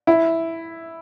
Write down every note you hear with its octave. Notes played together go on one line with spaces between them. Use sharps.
E4